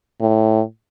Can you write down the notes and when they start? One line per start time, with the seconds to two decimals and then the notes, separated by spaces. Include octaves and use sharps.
0.21 A2